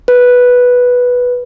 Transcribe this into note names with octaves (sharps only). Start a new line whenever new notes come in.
B4